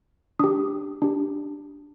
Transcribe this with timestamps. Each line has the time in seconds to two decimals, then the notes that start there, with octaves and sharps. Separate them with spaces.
0.39 D4 G4 D#6
1.02 D4 G4